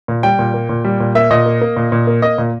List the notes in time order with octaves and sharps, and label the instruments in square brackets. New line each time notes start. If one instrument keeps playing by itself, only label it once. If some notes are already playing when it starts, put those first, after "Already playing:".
[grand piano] A#2
G3 G5
A#2
A#3
A#2
G3
A#2
A#3 E5
A#2 D#5
A#3
A#3
A#2
A#2
A#3
A#3 D#5
A#2